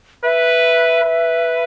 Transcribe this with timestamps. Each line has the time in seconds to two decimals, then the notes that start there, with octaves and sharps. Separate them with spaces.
0.24 B4 E5
1.04 B4